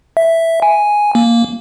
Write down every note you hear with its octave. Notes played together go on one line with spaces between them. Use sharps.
E5
G#5
A#3